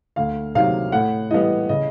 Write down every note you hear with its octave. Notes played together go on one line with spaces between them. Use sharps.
D2 F5
C3 D#3 F#3 F5
A2 F#5
E3 G3 B3 D#5
C#3 D#5